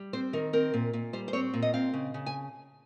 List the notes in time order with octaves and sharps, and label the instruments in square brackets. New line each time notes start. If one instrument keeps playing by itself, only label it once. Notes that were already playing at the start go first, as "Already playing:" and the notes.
Already playing: [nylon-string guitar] G3
C4 C5
D#3 A#4
C4 A#4
A#2
A#2
G3 C5
C5
C4 C#5
A#2
D#5
C4 F5
C#3
C#3
G#5